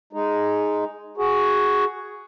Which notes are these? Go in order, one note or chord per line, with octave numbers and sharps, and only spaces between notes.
G#3 D#4
F#4 G#4